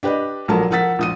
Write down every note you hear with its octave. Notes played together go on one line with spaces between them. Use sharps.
D4 G4 B4 D5 D#5
A#1 F#3 A4 A#4 A5
F3 A#4 F#5 E6 A6 B6
A#1 D#6 D#7